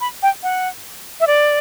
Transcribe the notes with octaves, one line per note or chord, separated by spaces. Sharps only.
B5
G5
F#5
E5
D5